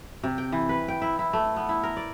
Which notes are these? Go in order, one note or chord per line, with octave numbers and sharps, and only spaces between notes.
C3
G5
E3
B4
G5
E4
E4
A3
B3
E4
A#4
D5